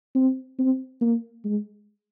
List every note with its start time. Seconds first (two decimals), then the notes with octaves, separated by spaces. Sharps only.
0.15 C4
0.59 C4
1.01 A#3
1.44 G#3